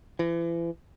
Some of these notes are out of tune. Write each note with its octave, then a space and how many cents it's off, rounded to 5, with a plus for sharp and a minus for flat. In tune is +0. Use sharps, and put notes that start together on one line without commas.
E3 +35